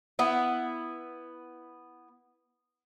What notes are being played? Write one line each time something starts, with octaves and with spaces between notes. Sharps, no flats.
B3 E4